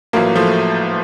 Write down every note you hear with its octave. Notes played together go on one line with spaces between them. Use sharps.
A1 A2 F3 F#3 A#3
F3 A3